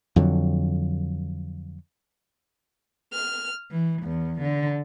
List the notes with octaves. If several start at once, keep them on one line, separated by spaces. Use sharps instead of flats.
F2 D3 F#3
F6
E3
E2
D3